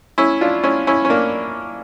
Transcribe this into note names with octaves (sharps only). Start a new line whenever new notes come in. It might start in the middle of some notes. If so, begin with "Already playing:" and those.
C#4 E4
D4 F4
C#4 E4
C#4 E4
C#4
A#3 D4